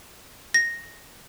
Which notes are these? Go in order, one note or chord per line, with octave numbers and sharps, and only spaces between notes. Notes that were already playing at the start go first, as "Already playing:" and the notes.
A#6